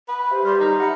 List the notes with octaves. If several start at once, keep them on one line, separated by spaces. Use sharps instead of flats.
B4
G4 C5 E5
G3 C6 F6 G6
D#4 A#5
E5 F#5 A#5 B5 C#7